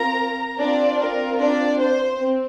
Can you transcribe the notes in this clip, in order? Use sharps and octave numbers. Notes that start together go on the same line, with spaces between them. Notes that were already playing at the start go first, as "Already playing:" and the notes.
Already playing: C4 F4 A#4 A#5
C4 D4 F4 D5
A#4
D4 D5
C5
C4